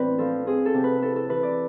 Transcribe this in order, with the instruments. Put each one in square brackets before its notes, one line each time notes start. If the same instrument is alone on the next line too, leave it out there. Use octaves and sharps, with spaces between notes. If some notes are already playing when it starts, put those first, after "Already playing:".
Already playing: [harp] A2 E3 C4 D4 B4 D5
F3 A4
C4 G#4
A4
C3
B4
E4 A4
A4
E3 B4
D5